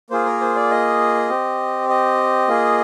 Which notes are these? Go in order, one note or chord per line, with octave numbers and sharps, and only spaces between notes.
A#3 F4 G#4 C5
A#4
C5
D5
D#5
C4 G4
D#5
A#3 F4 G#4